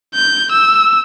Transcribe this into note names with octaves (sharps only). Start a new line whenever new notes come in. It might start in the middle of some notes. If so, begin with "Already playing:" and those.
G6
E6